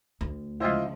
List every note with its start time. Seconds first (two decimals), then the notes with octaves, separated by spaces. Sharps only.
0.21 D2
0.60 C#2 F3 E4 F4 C5 D#5 G5